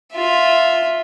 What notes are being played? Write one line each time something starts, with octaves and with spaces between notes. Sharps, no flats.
F4 E5